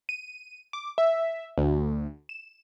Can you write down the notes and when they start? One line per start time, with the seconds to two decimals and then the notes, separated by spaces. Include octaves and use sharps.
0.09 D#7
0.73 D6
0.98 E5
1.58 D2
2.29 E7